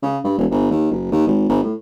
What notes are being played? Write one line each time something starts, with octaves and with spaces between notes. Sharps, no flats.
C#3
G2
E1
G1
D#2
F#1
D#2
G#1
G1
A2